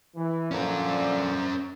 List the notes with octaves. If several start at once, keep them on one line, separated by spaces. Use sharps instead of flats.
E3
A#2 D3 F3 C#4 A#4